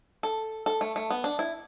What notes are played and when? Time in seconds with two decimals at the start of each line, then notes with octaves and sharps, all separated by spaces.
0.23 A4
0.66 A4
0.81 A3
0.96 A3
1.10 B3
1.24 D4
1.39 E4